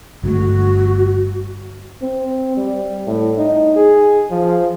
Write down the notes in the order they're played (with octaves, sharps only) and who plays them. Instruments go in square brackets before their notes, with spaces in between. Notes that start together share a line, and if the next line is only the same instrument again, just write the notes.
[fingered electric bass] G1 G2 A3 [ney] F#4
[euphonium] C4
G3
A2
D#4
G#4
F3